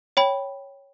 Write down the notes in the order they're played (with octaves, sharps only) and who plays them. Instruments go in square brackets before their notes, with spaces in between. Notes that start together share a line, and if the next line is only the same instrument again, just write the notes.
[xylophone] C#5 G5 B5